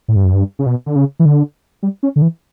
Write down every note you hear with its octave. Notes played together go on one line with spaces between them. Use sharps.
A2
G2
F#2
G2
C#3
B2
D3
C#3
E3
D3
G3
C#4
D3
E3